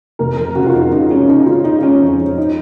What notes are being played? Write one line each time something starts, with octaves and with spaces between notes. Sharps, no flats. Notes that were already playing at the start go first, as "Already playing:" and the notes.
F1 A#4
F2 A#4
C#3 F#4
F4
F2 D#4
C#3 D#4
G#3 C#4
C#3 D#4
C#3 F4
C#3 D#4
G#3 C#4
F2
F2
D#4